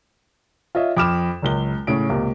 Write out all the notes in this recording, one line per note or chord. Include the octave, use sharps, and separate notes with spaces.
F4 C#5 D#5 E5
F2 B5 D6 F6 E7
F#1 C#2 G7
A2 C#3 D7
C#2 C3 A#3